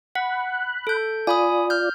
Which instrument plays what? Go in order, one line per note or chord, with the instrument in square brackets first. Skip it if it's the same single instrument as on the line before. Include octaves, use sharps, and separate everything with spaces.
[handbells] F#5 [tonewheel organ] B5 F#6
[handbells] A4 G6
[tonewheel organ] F4 D5 [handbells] G#5 B5 D#6
[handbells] F6 G6